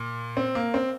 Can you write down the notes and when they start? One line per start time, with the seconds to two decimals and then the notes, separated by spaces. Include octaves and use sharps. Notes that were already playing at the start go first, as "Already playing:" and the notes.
Already playing: A#2
0.37 C4
0.55 A#3
0.74 C4